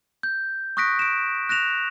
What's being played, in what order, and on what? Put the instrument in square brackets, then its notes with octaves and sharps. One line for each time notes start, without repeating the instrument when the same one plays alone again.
[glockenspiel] G6
C#6 D#6 F#6 A#6 B6 D7
D7 E7
F#6 A#6 E7 F7